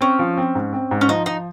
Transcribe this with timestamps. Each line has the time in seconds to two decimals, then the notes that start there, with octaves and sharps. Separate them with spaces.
0.01 C4 C#4
0.19 F3
0.38 C4
0.55 G#2
0.73 C4
0.91 G#2
1.01 C#4
1.09 F3 D#4
1.26 F3 D#4